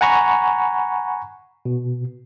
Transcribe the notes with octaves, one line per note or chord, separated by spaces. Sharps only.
F#5 G#5 A#5 B5 C#6
B2